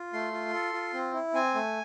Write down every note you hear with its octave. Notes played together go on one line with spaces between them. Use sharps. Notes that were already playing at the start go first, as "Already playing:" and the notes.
Already playing: F4
A3 C6
F4
A4
F4
C4
E4
C4 G#5
A3